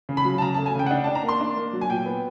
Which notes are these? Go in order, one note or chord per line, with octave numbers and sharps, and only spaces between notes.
C#3
B5
F#3
A5
C#3 A#5
A5
A3
G#5
C#3 G5
F#5
D4 G5
A5
D4
A#5
A#3
C6
D4
A#3
F#3
G#5
A#2 G5
B3